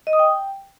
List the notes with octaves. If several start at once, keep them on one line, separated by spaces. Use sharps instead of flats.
D#5
D#6
G5